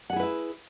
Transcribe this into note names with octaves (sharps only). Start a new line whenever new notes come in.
E4 G#4 B4 E5 F#5